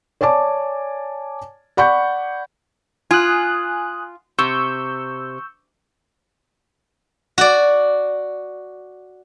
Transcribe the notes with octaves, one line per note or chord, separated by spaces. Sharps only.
C#5 D5 G#5 A5 D6
D5 F#5 B5 C#6 G6
F4 G#5 D#6 F#6
C3 C#6 E6 G6
F#4 D5